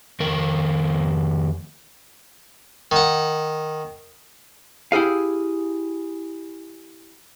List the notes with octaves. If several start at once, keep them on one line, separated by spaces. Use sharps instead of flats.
F2 D#3 A#4
D#3 F#5
E4 G4 G#4 F5